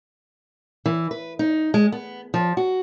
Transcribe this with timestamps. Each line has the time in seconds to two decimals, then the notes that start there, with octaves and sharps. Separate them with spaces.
0.86 E3
1.11 B4
1.39 D#4
1.74 G#3
1.92 B3
2.34 F3
2.57 F#4